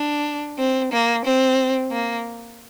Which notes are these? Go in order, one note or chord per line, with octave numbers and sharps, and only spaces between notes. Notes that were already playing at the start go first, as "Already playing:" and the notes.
Already playing: D4
C4
A#3
C4
A#3